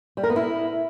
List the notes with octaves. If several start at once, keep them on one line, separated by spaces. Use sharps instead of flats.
G3
A#4
B3
E4